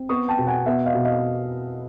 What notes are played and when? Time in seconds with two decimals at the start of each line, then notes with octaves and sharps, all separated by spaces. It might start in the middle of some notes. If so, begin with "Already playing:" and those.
Already playing: C4
0.09 B3 C#6 D#6
0.28 G5 A5
0.39 B2
0.47 F#5 G#5
0.66 B3 E5 F#5
0.86 D#5 F5
0.95 B2
1.05 D#5 F5